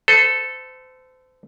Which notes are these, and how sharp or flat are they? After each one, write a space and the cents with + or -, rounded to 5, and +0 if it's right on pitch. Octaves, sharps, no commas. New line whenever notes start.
A4 +0 C5 -35